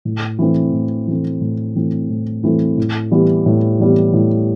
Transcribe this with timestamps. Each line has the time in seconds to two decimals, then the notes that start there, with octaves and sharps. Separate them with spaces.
0.05 A2
0.39 E3 A3 C4
0.73 A2
1.07 E3 A3 C4
1.41 A2
1.76 E3 A3 C4
2.10 A2
2.44 E3 A3 C4
2.78 A2
3.11 E3 G3 B3
3.46 A2
3.80 E3 G3 B3
4.14 A2